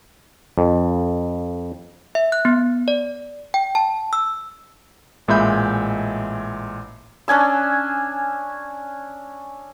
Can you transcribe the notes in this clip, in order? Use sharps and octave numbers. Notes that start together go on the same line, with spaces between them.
F2
E5
F#6
B3
D5
G5
A5
E6
A1 A#2 G#3 E5 B5 G6
C#4 D4 G#5 E6